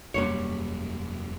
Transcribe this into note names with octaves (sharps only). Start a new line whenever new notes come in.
E1 F#2 G3 A#3 D4 C#5